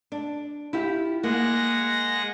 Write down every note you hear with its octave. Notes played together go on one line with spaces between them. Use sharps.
D4
E4 F4 G4
G#3 A#3 F#5 A#6